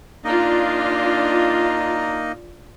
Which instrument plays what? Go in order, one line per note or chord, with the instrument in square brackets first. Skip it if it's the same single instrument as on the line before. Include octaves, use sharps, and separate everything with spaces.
[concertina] A#3 D#4 D#5 [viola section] D4 F4